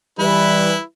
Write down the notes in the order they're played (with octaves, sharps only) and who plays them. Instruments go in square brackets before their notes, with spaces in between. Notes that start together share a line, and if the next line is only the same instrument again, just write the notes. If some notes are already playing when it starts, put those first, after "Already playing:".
[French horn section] E3 G3 [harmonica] E4 B4